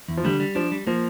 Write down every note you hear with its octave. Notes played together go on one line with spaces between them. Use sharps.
E2
F3
D3 G3
G3
F3 D4
G3
F3 A#3